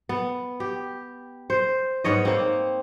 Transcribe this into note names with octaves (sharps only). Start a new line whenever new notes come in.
B3
G4
C5
G#2 B3 C#5 D#5
A#3 C4